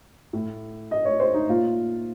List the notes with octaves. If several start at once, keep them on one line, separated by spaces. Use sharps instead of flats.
A2
D#5
C#5
C5
D#4
A#2 F4